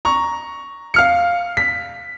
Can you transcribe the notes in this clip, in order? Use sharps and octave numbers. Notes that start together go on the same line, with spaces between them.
A#5 C#6
F5 F6 C#7
B6